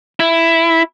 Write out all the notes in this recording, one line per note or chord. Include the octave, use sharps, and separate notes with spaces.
E4